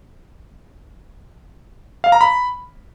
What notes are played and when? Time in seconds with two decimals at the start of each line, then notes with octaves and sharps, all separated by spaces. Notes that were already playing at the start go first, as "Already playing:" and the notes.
2.04 F5
2.12 A#5
2.21 B5